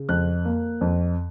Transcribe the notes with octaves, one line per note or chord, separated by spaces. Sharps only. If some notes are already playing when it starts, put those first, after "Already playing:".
Already playing: C#3
F2 F#6
A#3
F2